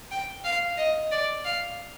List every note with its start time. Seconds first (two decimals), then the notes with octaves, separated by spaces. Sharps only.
0.11 G5
0.44 F5
0.78 D#5
1.12 D5
1.45 F5